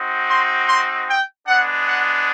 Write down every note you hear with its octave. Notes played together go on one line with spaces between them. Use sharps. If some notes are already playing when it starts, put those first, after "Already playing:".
Already playing: C4 D#4 F#4
C6
C6
G5
G#3 B3 D4 F#5
F#5